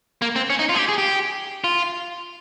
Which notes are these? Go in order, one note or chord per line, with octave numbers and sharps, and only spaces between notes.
A#3
C4
C#4
D#4
F4
G#4
G4
G#4
G4
F4